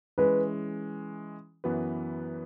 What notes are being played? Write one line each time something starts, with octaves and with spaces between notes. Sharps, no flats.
E3 G#3 C#4 B4
F#2 E3 B3 F#4 B4